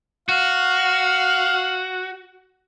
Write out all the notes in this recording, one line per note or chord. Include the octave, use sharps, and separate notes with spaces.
F#4 F5